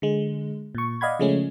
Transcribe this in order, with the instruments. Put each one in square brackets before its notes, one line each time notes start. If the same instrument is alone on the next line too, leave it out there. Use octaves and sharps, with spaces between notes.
[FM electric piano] D3 G#3
A#2 C#6
D5 D#5 F5 F#5 B5 G#6
C#3 F3 G#3 A3 C#4